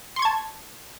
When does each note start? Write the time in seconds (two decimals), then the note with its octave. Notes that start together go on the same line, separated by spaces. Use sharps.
0.16 C6
0.19 C#6
0.22 G#6
0.25 A5